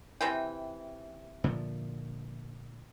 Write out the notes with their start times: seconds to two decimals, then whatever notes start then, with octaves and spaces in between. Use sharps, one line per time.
0.21 C3 E3 G5
1.44 A#2 D3 F3